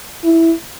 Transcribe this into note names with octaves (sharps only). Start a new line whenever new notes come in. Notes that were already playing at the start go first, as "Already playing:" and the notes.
E4